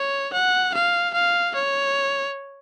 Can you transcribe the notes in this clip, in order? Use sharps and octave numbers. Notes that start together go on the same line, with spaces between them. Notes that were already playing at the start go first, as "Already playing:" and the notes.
Already playing: C#5
F#5
F5
F5
C#5